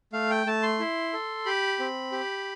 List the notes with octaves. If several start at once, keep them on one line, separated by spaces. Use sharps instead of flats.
A3 F5
G5
A3 A5
C6
E4
A4
G4 B5
C4
G4